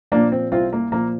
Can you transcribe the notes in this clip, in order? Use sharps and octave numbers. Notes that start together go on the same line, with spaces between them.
A#2 F3 A#3 D4
C4
C2 C4 F4
A#3
A#2 F3 A#3